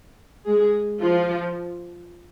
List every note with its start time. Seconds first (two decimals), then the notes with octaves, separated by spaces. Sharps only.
0.46 G#3 G#4
1.00 F3 F4